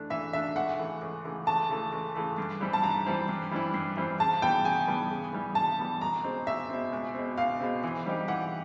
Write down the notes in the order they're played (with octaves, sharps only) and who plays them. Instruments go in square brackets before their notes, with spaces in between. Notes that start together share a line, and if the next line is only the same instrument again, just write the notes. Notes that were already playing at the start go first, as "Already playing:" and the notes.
Already playing: [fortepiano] E3 A3 D4
[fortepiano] E3 [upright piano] E5
[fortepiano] A3 D4 [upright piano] E5
[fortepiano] C#2 [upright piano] F#5
[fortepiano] C#3 E3 A3
C#2
C#3 E3 A3
[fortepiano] C#2 [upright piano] A5
[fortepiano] C#3 E3 A3
C#2
C#3 E3 A3
G2
E3 G3 C4 E4
[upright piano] A5
[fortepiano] G2 [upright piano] A#5
[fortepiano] E3 G3 C4 E4
G2
E3 G3 C4 E4
G2
E3 G3 C4 E4
[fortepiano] C#3 [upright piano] A5
[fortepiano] E3 G3 B3 [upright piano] G5
[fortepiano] C#3 [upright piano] G#5
[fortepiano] E3 G3 B3
C#3
E3 G3 B3
[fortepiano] C#3 [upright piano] A5
[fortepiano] E3 G3 B3
[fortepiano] C#2 [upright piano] A#5
[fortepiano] B2 G#3 C4
[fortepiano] C#2 [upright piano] E5
[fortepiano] B2 G#3 C4
C#2
B2 G#3 C4
[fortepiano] C#2 [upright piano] F5
[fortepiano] B2 G#3 C4
E3
G3 C4 D#4 G4
[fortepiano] E3 [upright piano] F#5